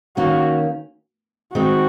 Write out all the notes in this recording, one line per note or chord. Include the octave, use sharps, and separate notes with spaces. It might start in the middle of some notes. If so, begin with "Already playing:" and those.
D#3 A#3 C#4 F#4
D#3 G#3 C4 D#4 F#4